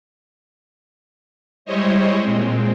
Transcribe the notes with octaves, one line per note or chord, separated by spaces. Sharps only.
G3 G#3 E4 C5 C#5 D#5
A#2 G#3 C4